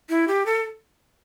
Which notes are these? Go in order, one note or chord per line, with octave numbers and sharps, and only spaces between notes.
E4
G4
A4